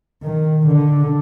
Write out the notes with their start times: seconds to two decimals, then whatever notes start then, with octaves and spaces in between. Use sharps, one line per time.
0.23 D#3
0.66 D3